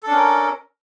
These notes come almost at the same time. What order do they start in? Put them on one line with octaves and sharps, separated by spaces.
A4 D4 C#4 A#4